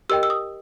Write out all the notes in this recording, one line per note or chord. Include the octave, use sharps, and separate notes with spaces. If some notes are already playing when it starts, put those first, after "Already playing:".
G4 A#4 D#5 G5 E6
E6
D#6